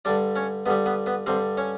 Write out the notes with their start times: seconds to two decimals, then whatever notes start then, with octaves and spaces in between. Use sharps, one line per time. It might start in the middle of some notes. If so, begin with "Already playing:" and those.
0.05 G2 D3 G3 D4 D5
0.36 C#4 C#5
0.66 G2 D3 G3 B3 B4
0.86 B3 B4
1.06 B3 B4
1.26 G2 D3 G3 C4 C5
1.57 C#4 C#5